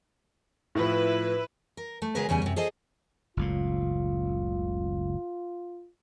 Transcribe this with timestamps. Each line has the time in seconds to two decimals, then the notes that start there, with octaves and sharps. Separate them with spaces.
0.75 A2 F3 E4 B4
1.77 A#4
2.02 A3
2.15 C#3 F#3 G#3 G#4 A#4 B4
2.29 E2 C#3 G3 G#5
2.42 F#2 C3
2.56 G#4 A4 C5 D#5
3.37 F#1 C#2 A2 F4